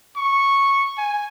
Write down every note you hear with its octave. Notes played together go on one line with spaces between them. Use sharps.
C#6
G#5